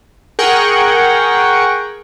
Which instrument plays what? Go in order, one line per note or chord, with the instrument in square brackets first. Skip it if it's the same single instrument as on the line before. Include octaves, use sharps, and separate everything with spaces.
[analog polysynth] G#4 A#4 F#5 G5 C#6